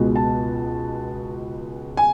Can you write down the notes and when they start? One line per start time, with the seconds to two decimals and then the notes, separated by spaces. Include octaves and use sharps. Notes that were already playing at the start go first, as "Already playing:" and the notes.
Already playing: C#2 B2 G#3
0.16 A5
1.97 G#5